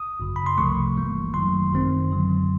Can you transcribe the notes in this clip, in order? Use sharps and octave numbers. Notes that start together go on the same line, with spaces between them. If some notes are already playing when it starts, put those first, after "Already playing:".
Already playing: D#6
G#1 F#2 C#3
B5
C6
C2 C3 F3 A3 C#6
G1 G2 E3 G3 A#3
F#2 D#3 F#3 A3 C6
G#1 F#2 D#3 G#3 C4
F#2 D3 F#3